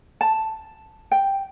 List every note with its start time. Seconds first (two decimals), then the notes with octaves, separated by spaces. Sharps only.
0.21 A5
1.11 G5